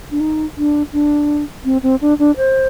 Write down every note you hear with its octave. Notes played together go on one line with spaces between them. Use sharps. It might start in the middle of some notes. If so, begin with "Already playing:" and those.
D4
D#4
D4
D4
C4
C4
D4
D4
C5